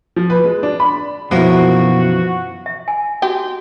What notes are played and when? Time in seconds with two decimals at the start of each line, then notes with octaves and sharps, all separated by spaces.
0.16 F3
0.30 B4
0.44 G#3
0.63 D4
0.80 B5
1.31 F#2 B2 E3 F3 A#3 F#4 A#4
2.66 E5
2.88 G#5
3.22 F#4 G4